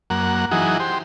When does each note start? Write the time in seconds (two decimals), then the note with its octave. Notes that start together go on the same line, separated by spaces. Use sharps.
0.10 F#2 A#3 F#5
0.51 E3 F#3 D#4 F#4 G#4
0.80 G4 C5